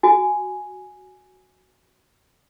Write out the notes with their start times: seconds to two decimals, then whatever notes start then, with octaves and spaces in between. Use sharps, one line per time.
0.03 F#4 G#5